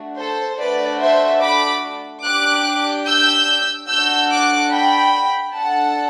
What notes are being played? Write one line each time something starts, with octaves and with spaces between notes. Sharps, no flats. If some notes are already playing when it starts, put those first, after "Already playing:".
Already playing: A3 D4 F#4
A4 C5
A3 D4 F#4 A4 B4 D5
C5 E5
B5 D6
D4 G4 D6 F#6
E6 G6
D4 F#4 A4 E6 G6
D6 F#6
G5 B5
D4 A4 F#5 A5